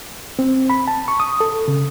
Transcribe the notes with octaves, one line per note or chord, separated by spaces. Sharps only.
C4
B5
A5
C#6
D#6
A4
C#3